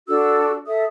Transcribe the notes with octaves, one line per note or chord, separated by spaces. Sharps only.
D4 F#4 A4 E6
A4 E5 D#6